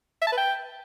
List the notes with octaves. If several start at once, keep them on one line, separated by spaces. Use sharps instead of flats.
E5
A5
B4
G5